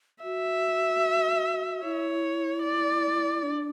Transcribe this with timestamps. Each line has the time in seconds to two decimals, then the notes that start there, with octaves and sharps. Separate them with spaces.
0.24 F#4 E5
1.84 E4 C#5
2.63 D5
3.43 D4